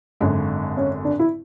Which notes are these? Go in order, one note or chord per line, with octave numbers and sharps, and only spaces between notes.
G#1 F#2 D3 G#3
C#4
D4
E4